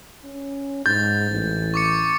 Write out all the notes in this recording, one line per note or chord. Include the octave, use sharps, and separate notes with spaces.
C#4
G#2 G6 A6
A1
C#6 D6 C#7